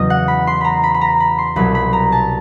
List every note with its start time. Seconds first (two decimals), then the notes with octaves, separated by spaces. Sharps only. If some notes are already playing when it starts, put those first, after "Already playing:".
Already playing: E2 C#3 F#3 D#5
0.10 F#5
0.28 B5
0.47 C6
0.61 A#5 B5
0.84 B5
0.94 B5
1.01 A#5
1.20 B5
1.38 C6
1.56 C2 B2 F#3 B5
1.75 B5
1.93 A#5
2.12 A5